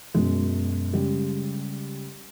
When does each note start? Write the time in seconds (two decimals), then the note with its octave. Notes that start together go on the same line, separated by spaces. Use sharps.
0.14 F#2 B2 G#3
0.93 C#3 G3 G#3 G4